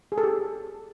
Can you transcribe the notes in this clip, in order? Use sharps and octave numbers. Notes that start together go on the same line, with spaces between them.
G#4
A4
G4